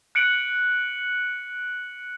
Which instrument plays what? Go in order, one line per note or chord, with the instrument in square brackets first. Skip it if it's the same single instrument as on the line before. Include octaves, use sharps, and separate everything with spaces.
[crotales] F#6 C#7 D7 F#7